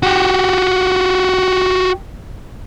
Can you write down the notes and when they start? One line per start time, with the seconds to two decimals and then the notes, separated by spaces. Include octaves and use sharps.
0.03 F#4 G4